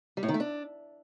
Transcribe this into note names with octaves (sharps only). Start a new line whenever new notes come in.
G3
A2
D#3
A3
D4